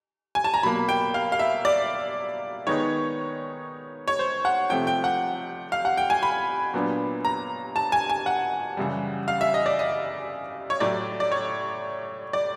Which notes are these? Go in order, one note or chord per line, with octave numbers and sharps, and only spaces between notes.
G#5
A5
A#5
B2 F#3 A#3 B5
G5
F5
F5
E5
D5
D#3 G#3 B3 D#4 C#5
C#5
C5
F#5
C3 F3 A3 G5
G5
F#5
F5
F#5
G5
G#5
B5
A#2 F#3 B3 D4
A#5
A5
G#5
G#5
F#5
F#2 C#3 E3 G3
F5
E5
D#5
D5
D#5
C#5
A2 F#3 A3 D5
D5
C#5
D5